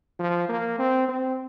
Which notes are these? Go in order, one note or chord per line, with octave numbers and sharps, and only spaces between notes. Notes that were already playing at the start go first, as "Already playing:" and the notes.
F3
A#3
C4
C4